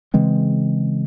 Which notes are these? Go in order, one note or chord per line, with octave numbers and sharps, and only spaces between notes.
C#3 E3 G#3 C4